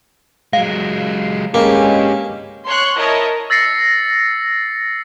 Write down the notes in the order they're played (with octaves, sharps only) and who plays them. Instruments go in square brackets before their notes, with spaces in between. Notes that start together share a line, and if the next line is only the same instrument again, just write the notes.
[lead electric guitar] F#3 G#3 [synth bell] F5
[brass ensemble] G#3 C#4 [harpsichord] A#3 [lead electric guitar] G4 B4
[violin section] C#5 C6 C#6 F#6
E4 A#4 C#5 D#5 A5
[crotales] E6 A6 A#6 C7 C#7